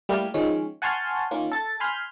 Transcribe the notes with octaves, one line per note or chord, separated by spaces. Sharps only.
G3 A3 A#3 E4 G4 A#4
D#3 F3 G#3 C#4
F#5 G#5 A5 C6 C#6 F6
D#3 A#3 C#4 F4
A4 A6
G#5 B5 C6 F6 G6